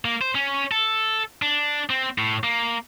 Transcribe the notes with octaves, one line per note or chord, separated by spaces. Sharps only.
A#3
C5
C#4
A4
D4
C4
A2
A#3